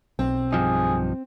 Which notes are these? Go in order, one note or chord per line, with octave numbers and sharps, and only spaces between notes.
B1 C4
G2 F3 D#4 G#4